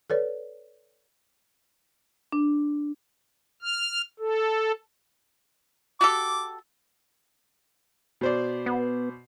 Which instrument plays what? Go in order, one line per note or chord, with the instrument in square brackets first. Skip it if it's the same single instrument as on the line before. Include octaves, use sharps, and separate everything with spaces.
[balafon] A4 B4 C#5 D5
[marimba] D4
[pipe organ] F6
A4
[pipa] F#4 G4 A4 [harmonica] D6
[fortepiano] B2 C5 D5
[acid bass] B3